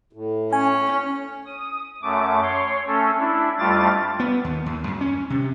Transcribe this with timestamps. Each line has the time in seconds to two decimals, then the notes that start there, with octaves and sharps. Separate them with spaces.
0.13 A2
0.53 C#4 G#5
1.46 D#6
2.02 F#2 A3 D6
2.43 C#5 C6
2.87 A3 C#4 A4
3.19 D4 E4
3.59 F2 G3 A3 F4 D6 A6
4.20 B3
4.44 D#2
4.66 D#2
4.87 F#2
5.01 C#4
5.30 C3